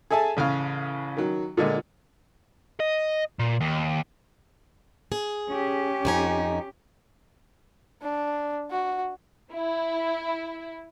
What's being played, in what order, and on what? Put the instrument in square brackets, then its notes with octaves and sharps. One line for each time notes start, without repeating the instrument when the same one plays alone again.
[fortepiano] G#4 A4 E5 G#5 A5
A1 C#3 F5 F6
D#3 F#3
A#2 D3 G#3
[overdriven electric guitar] D#5
A#2
D#2
[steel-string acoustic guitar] G#4
[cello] C#4 G4
[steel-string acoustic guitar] F2 D#4 G#5
[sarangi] D4
F#4
[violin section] E4